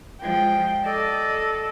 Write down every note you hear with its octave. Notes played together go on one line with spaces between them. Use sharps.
F3 G#3 G5
A4 D5 D#5